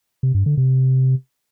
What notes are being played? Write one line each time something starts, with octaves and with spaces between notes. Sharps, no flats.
C3
G2
D3
C3